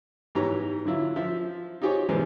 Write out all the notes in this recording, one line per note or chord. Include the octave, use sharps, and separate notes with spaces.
G#2 E3 B3 G4 C#5 A#5
D3 F#3 E4 F4
F3 C5 E5
D#4 F4 G4 G#4 C5 C#5
E2 B2 G#3 B3 C4 D#4